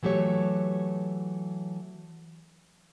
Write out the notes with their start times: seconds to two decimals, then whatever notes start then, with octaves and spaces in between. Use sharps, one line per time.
0.03 E3 F#3 A3 G4 C#5